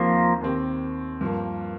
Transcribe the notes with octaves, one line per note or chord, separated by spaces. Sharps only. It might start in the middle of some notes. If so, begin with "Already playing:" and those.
Already playing: D#2 D#3 F3 A#3 C4 G4
D#2 D#3 C4 G4
G2 F3 A#3